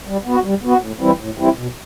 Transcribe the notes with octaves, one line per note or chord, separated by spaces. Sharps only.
G3
B3 F#4
G3
B3 F#4
A2
E3 G3 C4 E4
A2
E3 G3 C4 E4
B2